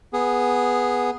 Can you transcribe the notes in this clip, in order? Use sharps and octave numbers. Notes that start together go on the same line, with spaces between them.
B3 G#4